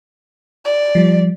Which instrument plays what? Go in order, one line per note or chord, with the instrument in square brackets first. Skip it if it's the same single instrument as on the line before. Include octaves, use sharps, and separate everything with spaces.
[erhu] D5
[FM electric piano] F3 G3